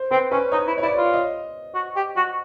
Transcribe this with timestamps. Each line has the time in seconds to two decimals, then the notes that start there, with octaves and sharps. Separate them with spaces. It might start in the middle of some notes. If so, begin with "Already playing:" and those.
Already playing: C5
0.11 C4 B4
0.31 C#4 B4
0.52 D#4 C#5
0.67 E4
0.78 C#5
0.82 E4 D5
0.98 F4
1.13 D#5
1.75 F#4
1.96 G4
2.16 F#4